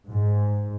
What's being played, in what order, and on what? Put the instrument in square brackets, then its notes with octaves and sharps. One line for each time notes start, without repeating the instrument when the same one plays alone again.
[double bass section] G#2